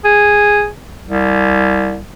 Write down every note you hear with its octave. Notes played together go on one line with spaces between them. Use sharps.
G#4
C2